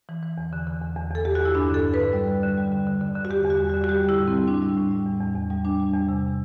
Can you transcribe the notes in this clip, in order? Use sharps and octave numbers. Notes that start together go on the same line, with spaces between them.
E3
E3
E2
D3
D3
E2
E2
E2 A4
E2 G4
F#4
E2 E4
G2 D4
D3 A4
G2
D3 B4
G3
D3
D3
G3
D3
D3
D3
D3
F#4
E2 G4
E2 F#4
G3
D3 F#4
F#4
G3 G4
G3 E4
A2
C4
G3
G3 D4
G3
A2
G3
E2
E2
E2
G3
G3 D4
G3
E2
C3